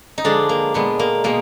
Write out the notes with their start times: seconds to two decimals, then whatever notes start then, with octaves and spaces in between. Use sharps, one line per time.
0.18 D#4
0.24 D3 F3 G#3 D4
0.49 A#3
0.74 A#2 G#3 B3
0.99 A#3
1.24 B2 G#3 A#3